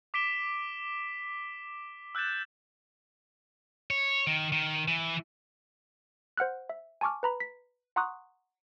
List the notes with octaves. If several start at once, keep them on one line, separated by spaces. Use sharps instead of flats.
D6 B6 D7 E7 G7
E6 F#6 G6 A6 E7
C#5
D#3
D#3
E3
C5 F#5 F6 F#6
E5
G#5 A5 C#6 D6 F6
B4 A#5 B5
B6
F#5 A#5 C6 C#6 D#6 F#6